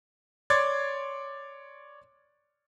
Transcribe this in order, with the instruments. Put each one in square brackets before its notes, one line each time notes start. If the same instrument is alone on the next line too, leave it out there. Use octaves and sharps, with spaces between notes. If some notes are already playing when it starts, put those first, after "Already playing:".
[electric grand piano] C#5 D5 C6 D6 G#6 A6